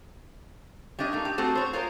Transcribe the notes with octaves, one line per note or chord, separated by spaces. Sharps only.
G3 C#4 D4 D#5
A3 A#3 D#4
G4
A3 C4 F#4 G#4
C5 C#5
F4 G#4 A#4 C5